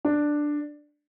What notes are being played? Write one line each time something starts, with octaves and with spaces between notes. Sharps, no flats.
D4